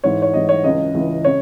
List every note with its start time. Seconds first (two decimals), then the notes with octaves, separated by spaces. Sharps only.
0.04 G#2 E3 C#5
0.22 C#5
0.33 G#2 E3 D#5
0.49 C#5
0.64 C#2 C#3 E3 D#5
0.94 C#2 C#3 E3
1.25 C#3 C#5